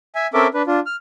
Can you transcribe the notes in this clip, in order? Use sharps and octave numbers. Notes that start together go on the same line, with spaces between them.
E5 G#5
C4 C#4 A4 A#4 E5 D6
D4 B4
D4 F4
F6